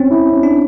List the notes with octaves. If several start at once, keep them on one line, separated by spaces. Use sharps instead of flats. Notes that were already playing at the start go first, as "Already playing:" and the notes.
Already playing: C4 C#4
E4
C#4
D4